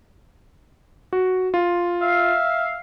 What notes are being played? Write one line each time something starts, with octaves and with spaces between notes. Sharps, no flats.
F#4
F4
E5 F5